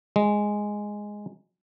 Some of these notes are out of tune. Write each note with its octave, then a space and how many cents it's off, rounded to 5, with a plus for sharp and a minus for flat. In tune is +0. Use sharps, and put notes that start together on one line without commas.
G#3 +0